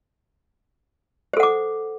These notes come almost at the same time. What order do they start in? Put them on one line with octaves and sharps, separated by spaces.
C5 A4 F#5 D6